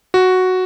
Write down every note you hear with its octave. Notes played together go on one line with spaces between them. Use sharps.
F#4